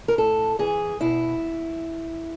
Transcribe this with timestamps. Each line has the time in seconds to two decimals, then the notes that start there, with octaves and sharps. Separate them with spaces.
0.08 A#4
0.18 A2 A4
0.59 E3 G#4
1.00 B2 E4